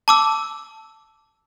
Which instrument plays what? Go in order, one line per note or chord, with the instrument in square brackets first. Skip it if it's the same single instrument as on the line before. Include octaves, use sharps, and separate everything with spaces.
[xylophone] A5 D6 E6